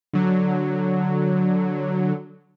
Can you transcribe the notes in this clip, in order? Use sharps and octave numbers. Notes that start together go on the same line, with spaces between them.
D3 F#3